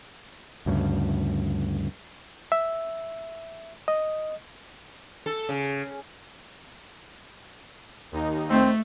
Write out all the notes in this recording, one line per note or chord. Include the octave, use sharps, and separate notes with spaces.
D2 G2 C#3
E5
D#5
A4
C#3
D#2 D#4
A3 C4